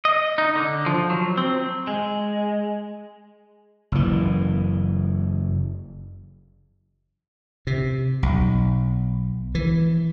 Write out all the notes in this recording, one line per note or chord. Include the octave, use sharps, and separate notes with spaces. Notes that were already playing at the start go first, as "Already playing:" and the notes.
D#5
D#4
D3
F3
F#3
C4
G#3
F#1 E3
C3
B1
E3